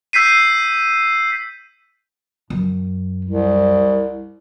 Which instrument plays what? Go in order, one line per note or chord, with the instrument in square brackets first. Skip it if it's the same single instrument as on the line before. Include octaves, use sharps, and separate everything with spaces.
[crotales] E6 G6 B6 C7 D#7
[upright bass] F#2
[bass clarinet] C2